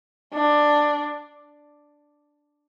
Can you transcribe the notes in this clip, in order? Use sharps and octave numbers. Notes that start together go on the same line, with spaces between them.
D4